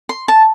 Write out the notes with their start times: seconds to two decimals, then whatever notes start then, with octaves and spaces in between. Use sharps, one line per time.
0.09 C6
0.28 A5